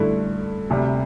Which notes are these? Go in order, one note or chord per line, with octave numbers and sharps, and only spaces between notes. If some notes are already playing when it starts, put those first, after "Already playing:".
Already playing: G2 D3 A3 E4
D2 C3 G3